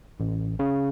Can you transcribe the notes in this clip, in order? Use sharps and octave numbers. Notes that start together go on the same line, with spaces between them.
A1
C#3